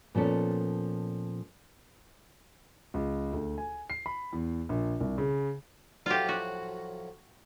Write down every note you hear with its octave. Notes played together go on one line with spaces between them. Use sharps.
A#2 F3 B3 C#4 A4
C#2
D2
G#5
C7
B5
E2
A#1
C2
C#3
A2 F3 F#3 F4 G4
F#4